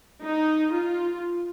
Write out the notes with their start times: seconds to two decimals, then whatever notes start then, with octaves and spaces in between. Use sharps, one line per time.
0.25 D#4
0.74 F4